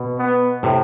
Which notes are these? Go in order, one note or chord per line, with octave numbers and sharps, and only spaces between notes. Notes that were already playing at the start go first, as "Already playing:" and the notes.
Already playing: B2
B3
A2 C3